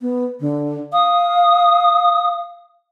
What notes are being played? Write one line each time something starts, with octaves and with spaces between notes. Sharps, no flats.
B3
D3
F5 D#6